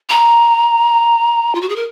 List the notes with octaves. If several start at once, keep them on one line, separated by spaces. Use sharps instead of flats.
A#5
F4
F#4
G#4
A#4